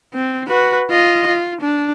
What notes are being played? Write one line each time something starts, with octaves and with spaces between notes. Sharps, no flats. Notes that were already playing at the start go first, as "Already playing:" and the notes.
C4
F#4 B4
F4 D#5
F4
D4